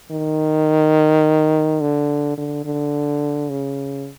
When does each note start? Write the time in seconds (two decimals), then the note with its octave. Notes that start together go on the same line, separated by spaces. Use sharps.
0.11 D#3
1.81 D3
2.38 D3
2.65 D3
3.50 C#3